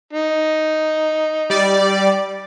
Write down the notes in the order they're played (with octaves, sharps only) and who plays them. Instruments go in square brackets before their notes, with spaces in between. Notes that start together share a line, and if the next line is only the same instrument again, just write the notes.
[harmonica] D#4
[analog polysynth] G3 D5